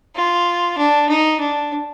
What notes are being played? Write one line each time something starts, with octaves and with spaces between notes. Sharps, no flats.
F4
D4
D#4
D4